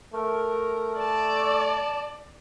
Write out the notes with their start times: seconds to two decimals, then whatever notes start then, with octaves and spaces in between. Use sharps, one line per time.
0.13 A3 A#4
0.98 D5 A5